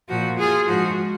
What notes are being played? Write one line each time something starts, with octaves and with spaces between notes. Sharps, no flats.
A#2 F3 F#4
F4 G#4
G#2 F3 F#4